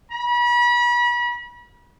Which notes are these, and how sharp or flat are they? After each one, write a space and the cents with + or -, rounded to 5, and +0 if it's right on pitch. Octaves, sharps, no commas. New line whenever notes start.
B5 -35